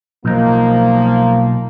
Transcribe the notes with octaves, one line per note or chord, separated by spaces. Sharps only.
B1 F3 A#3 D#4